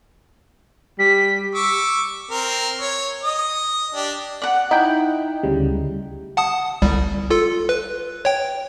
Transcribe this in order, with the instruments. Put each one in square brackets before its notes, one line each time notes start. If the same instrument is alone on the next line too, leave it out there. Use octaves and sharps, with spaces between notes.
[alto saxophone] G3 [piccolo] B6
[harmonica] C#6 D6 E6
C4 A#4
C#5
D#5 D#6
D4 G4
[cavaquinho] D5 F#5
[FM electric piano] D#4 G5 [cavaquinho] E4
[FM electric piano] D2 C#3 G3
[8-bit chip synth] F#5 A5 D#6
G1 C2 G3
F4 A4
B4
C#5 G5